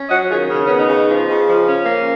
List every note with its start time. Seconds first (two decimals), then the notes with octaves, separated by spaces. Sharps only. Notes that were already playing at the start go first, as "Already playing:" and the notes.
Already playing: C#4
0.09 F#3 D#5 F#5
0.29 D#3 F4 G#4
0.49 C#3 C#4
0.66 B3 C#4
0.78 D#4
0.87 C#3
1.07 F3
1.27 C#3
1.46 F3
1.66 C#4
1.85 A#3